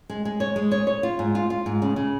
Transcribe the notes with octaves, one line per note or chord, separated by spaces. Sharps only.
G#3
G#3
C#5
G#3
C#5
C#5
F4
G#2
F4
F4
G#2
C#3
C#3